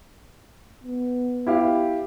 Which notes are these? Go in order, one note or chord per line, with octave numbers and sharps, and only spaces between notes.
B3
E4 G4 F5